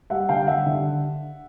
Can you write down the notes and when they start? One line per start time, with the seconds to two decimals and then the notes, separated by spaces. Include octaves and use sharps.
0.10 G3 E5 F#5
0.29 D3 F5 G5
0.47 G3 E5 F#5
0.66 D3